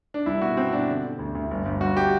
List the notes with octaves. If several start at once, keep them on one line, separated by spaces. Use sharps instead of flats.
D4
C2 E4
B2 F#4
B2 C4
B2 D4
D3
D3
D2
D2
G1
G1
G1 F#4
G4